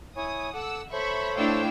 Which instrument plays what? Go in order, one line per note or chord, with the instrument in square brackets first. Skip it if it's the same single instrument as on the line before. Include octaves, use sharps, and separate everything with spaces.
[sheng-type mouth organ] E4 C#5 G#5 [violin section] D#6
[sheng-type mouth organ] A4 D6 [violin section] F#5 E6
[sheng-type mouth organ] A4 C5 C#5 [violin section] E5 B5 C#6
[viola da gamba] A3 D4 E4 [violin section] F5 G5 E6